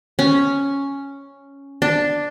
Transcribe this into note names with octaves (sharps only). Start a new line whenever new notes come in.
C#4
D4